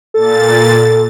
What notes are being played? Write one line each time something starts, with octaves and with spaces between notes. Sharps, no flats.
A#2 A4 A6